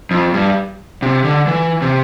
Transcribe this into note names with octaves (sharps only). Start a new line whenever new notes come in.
F2
G2
C3
D3
E3
C3